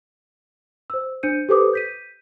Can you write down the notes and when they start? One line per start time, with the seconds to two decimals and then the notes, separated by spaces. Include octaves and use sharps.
0.90 C5 E6
1.23 D4 C5 G6 C#7 D#7
1.49 G4 A4 B4 C5 D6 D#6
1.73 G6 B6 D#7